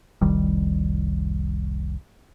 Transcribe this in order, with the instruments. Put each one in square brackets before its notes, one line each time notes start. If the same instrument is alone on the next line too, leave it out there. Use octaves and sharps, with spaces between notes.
[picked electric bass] F1 C2 D#3 G3